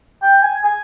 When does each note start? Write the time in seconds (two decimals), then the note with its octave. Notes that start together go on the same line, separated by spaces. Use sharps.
0.22 G5
0.42 G#5
0.64 G#5